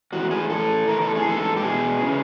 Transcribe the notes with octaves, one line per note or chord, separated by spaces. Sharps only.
A2 E3 F#4
G#4
A2 E3 A4
A2 E3 A#4
A4
G#4
G#2 E3 A4
G4
E2 B2 G#4
C#3 E3